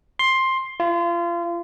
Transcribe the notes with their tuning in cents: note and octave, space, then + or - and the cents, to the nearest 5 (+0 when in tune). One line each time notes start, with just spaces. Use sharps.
C6 +10
F4 -30